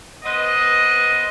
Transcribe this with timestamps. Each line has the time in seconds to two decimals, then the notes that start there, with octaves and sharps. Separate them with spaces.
0.24 B3 B4 C5 D#5